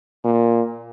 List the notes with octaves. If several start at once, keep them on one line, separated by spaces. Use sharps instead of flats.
A#2